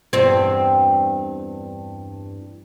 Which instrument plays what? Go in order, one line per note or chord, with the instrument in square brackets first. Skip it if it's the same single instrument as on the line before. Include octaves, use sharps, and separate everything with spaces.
[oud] E2 G2 C4